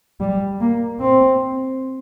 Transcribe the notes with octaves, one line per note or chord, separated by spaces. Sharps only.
G3
A#3
C4